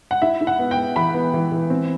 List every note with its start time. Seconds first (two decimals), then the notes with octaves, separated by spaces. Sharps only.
0.11 F#5
0.22 E4 E5
0.41 E4
0.47 F#5
0.59 B3
0.71 G5
0.77 B3
0.96 E3 B5
1.14 B3
1.34 E3
1.52 E3
1.70 C4